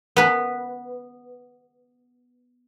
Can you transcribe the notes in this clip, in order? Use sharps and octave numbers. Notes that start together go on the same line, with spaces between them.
B3 B4